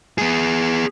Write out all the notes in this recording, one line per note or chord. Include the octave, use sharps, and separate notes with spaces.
B3 G#4